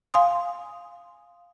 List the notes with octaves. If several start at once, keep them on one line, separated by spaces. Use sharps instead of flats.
F5 G#5 C6 D#6